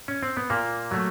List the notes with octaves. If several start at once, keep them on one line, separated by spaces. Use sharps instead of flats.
C#4
C4
B3
A#2 A#3
F#3 A3